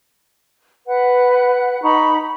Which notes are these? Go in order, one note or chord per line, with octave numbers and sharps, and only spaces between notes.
B4 F#5
D#4 A#5 B5 C#6